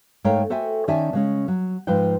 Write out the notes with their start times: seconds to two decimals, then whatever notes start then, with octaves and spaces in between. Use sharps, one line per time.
0.24 G#2 A3 A#4 C#5 F5 G5
0.50 F#4 A4 C5 E5 G5 G#5
0.88 D#3 C#4 D5 E5 G#5 A5
1.13 C#3 G#3 C#4
1.48 F#3
1.87 G#2 F3 B4 C5 G5